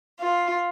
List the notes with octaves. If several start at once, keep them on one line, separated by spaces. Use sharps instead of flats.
F4